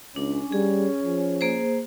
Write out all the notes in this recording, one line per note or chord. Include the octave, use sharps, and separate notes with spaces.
C#2 C#4 D4
G3 G#4
F3
A#3 G#4 C5